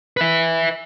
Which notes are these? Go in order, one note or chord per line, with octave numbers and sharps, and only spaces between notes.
B4 E5